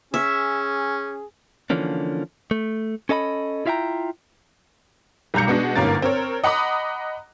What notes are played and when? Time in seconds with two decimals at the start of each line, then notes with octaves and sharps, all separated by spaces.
0.14 C#4 G#4 E5
1.70 D3 E3 F3 A#3 C#4 D4
2.51 A3
3.09 C#4 A4 D#5 A5 B5
3.66 E4 F4 E5 F5 G5 A#5
5.34 B1 G3 A#5 G6 C#7
5.47 B2 G#3 B3 D4 F#4
5.76 G1 G#2 A#3 C#4 A#4 A6
6.02 C4 A#4 C#5
6.44 D#5 F#5 A#5 B5 D6 D#6